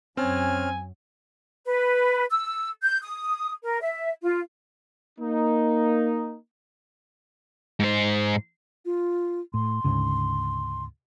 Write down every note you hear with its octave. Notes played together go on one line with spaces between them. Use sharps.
F#2 F#3 C4 C#4 G#5 F6
B4
E6
G6
D#6
A#4
E5
F4
A#3 D#4
G#2 C5
F4
A2 C6
D2 G#2 C#3